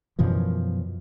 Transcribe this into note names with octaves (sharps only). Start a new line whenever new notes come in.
F#2 B2 E3 F3